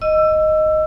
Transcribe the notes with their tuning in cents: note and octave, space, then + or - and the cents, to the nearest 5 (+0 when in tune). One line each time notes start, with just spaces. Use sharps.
D#5 +0 E6 +15